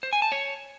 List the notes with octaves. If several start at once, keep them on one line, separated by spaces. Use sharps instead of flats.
C5
G#5
A5
C#5